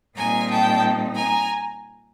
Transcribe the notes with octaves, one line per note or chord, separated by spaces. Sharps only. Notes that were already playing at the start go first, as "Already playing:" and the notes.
A#2 G3 C4 D#4 G#5 A#5
G5 A5
G#5 A#5